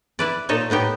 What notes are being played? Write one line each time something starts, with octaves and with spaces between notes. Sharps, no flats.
E4 B4 D5
A#2 D#4 A4 C#5
A2 B3 D#4 G4